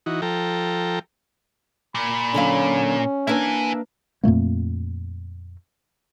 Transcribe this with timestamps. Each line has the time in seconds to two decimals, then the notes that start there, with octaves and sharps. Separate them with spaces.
0.06 E3 D#4 F#4
0.22 F3 A4 G5 A#5
1.95 A#2 B5
2.34 D3 F#3 C#4 F5
3.27 A#3 D4 E4 B4 E5 G#5
4.23 F2 A#2 A3 A#3